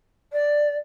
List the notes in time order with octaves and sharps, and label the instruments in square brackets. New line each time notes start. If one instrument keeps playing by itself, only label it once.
[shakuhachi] D5